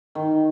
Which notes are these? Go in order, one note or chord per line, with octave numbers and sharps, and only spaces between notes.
D#3